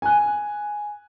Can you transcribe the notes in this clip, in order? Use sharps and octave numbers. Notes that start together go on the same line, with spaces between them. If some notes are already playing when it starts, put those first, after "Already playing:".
G#5 F#6